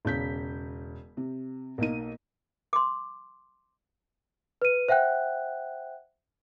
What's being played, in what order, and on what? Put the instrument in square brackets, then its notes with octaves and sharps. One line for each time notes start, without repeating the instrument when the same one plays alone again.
[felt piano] E1 C#3 G6 B6
C3
B1 A#3 D#4 D#7
[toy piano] C6 D6
[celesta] B4 D#7
C5 E5 F#5 G5 F#6